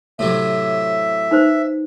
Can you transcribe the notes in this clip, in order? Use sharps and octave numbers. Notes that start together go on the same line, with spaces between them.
A2 C3 F#3 E5
D#4 B4 C5